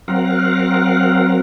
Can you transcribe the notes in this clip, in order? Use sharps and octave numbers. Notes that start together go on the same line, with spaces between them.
F#3 C4 A#4 F5 F#5